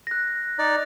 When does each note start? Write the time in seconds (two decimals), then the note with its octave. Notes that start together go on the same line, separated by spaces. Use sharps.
0.07 F#6 A#6
0.59 D#4 D5